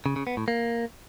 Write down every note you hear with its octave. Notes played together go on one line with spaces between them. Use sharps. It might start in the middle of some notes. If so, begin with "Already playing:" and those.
C#3
C#3
B3
A2
A#3